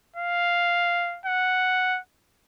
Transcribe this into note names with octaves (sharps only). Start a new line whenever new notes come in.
F5
F#5